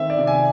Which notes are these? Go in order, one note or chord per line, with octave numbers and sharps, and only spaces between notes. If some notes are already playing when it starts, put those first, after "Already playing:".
Already playing: D#3 A3 C4 E5
D5
C3
G#5